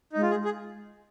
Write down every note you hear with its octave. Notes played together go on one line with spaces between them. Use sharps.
G#3 D#4
F4
G#4
G#4